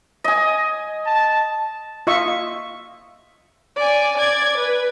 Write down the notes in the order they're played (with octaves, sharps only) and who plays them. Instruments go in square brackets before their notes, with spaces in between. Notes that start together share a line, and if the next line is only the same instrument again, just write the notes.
[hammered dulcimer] D#5 G#5
[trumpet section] A5
[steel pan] F4 D#5 E5 C#6
[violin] D5 G#5
D5 G#6
B4